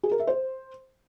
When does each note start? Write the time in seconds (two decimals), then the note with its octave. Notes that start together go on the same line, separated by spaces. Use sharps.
0.03 G#4
0.11 A#4
0.19 E5
0.27 C5